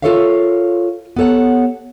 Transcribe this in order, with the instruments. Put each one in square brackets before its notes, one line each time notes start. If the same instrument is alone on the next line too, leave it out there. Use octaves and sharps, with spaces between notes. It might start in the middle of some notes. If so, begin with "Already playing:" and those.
[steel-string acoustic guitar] F4 A4 A#4 C#5 E5 F5
B3 G4 A4 C#5 F#5